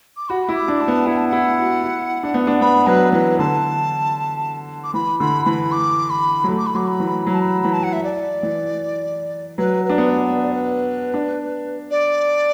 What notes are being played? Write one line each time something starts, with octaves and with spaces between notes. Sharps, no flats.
D6
F#4 B5
E4 B5
D6
D4
A5
B3
E4 F#5
A5
F#5
E4
F#4
E4
D4
B3
D4
B3 B5
F#3 B4
E3 B4
D3 A5
D6
E3 B5
D3 B5
E3 B5
D6
B5
F#3
A3
D6
B5
F#3 D6
B5
E3
F#3 B5
A5
B5
E3 B5
A5
F#5
E5
D5
E3
F#3 B4
D4 B4
B3
D5
B4
D5
B4
D4
D5